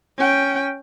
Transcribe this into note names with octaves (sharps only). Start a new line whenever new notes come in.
C#4 G5